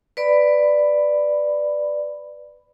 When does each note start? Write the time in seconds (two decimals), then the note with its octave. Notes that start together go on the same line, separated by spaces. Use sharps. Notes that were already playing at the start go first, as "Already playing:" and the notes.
0.17 B4 D5 B5